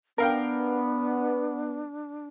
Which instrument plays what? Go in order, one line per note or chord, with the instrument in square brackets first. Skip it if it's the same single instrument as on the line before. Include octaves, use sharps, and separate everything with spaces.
[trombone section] B3 [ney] D4 [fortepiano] A#4 F5 G5